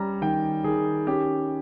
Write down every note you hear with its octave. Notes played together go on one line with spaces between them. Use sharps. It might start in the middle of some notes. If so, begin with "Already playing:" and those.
Already playing: G3 C#4 A#5
D#3 G5
D#3 G#4
C#4 G4